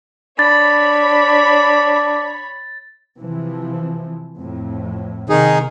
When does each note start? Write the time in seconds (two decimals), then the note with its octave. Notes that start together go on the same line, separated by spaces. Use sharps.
0.39 D4 C#5 B5 A6
3.18 C3 E3 F3
4.37 F2 A2
5.29 C3 D#3 D#4 G#4